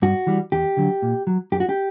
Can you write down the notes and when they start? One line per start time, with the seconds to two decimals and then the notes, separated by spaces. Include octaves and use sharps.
0.02 G2 F#4
0.27 E3 G3
0.52 E2 G4
0.77 D3 F#3
1.02 A#2
1.27 F#3
1.52 F#2 G4
1.60 F#4
1.69 G4